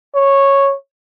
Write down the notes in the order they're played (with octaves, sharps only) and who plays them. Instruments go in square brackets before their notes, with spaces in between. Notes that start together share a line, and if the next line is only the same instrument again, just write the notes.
[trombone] C#5